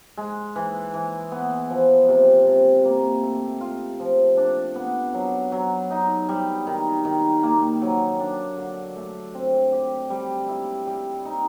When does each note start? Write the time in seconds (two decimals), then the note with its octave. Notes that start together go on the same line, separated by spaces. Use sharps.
0.18 G#3
0.56 E3
0.94 E3
1.32 B3
1.70 F3
2.08 C3
2.47 C3
2.85 A#3
3.23 A3
3.61 F4
4.00 F3
4.37 D4
4.76 B3
5.14 F#3
5.52 F#3
5.91 D#4
6.29 G3
6.67 D#3
7.05 D#3
7.43 A#3
7.82 F#3
8.20 D4
8.58 D3
8.96 A3
9.35 C4
9.72 G4
10.10 G3
10.48 E4
10.87 G3
11.25 D#4